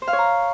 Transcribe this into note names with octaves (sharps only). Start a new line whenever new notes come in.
C5
F5
C#5
A#5